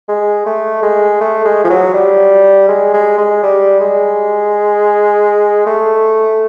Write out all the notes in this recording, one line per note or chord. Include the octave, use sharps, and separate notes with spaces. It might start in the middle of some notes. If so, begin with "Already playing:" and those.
G#3
A3
G#3
A3
G#3
F3
F#3
G3
G#3
G#3
G#3
G3
G#3
A3